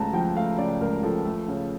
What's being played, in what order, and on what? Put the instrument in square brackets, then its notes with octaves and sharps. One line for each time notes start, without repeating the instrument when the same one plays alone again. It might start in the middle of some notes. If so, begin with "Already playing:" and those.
Already playing: [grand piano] C#2 C#3 A3 A5 A#5
F3 G5
A3 F5
C#3 D5
C#2 A#4
F3 A4
A3
C#3